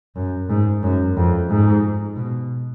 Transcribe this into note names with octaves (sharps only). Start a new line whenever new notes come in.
F#2
G#2
F#2
F2
G#2
B2